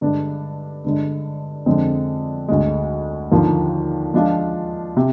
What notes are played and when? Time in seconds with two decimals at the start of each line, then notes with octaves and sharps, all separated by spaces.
0.01 G2 D3 G#3 D4
0.84 G2 D3 G#3
1.66 F2 D3 G#3 C4
2.48 D2 D3 G#3
3.32 D#2 D3 F3 A#3
4.14 F3 G#3 D4 F4
4.97 C3